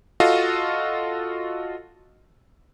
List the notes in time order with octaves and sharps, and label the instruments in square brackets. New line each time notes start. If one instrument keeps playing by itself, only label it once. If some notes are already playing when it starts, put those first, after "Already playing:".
[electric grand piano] F4 F#4 A4 D#5 F5